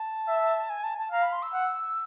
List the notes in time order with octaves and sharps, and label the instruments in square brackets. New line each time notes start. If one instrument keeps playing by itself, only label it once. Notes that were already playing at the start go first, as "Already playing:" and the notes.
Already playing: [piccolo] A5
[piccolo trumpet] E5
[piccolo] G#5
A5
A5
[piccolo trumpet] F5 [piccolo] A#5
[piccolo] B5
C6
E6
[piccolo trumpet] F#5